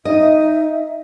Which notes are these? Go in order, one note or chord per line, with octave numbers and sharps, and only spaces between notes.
D#4 D#5 E5